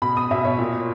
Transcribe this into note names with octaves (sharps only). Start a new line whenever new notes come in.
B2 B5
D#6
B2 E5
C#5
A#2